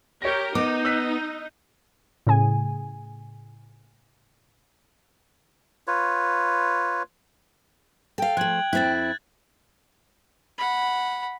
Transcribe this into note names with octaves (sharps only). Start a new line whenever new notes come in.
G4 A#4 C#5 A#6
B3 D#4 D6
E6 F#6 B6
A2 C#3 G#4 G#5
F4 B4 C#5
A4 F5 G5
F3 A3 F#6 G#6 F#7
F2 C4 E4 F#6 A6
F#5 B5